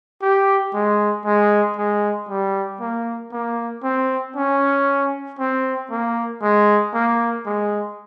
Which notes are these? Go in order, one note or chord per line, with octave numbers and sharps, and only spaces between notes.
G4
G#3
G#3
G#3
G3
A#3
A#3
C4
C#4
C4
A#3
G#3
A#3
G#3